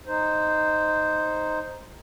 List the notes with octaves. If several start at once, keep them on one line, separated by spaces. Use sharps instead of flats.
D#4 C5